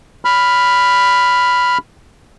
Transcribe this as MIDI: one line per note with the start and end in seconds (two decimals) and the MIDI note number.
0.25 1.78 83
0.25 1.78 89